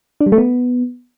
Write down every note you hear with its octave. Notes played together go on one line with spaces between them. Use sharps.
D4
G3
A3
B3